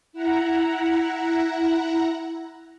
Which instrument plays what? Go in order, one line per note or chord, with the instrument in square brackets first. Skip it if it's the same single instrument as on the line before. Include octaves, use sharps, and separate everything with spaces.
[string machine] E4 F#5 A#5